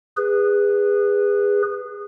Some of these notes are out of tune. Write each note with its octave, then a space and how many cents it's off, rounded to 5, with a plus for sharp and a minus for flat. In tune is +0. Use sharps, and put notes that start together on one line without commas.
G#4 -25 B4 +0